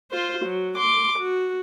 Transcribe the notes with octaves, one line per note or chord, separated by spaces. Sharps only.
F4 C5
F#3
C6 D6
F#4